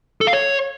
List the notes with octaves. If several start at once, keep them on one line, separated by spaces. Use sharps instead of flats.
A4
F5
C#5